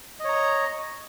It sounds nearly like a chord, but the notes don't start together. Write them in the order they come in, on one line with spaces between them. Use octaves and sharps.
D#5 C#5 A#5